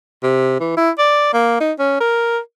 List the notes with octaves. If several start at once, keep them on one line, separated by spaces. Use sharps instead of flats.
C3
E3
E4
D5
A#3
D#4
C#4
A#4